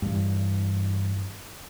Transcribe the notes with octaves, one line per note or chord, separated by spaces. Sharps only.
G2 E3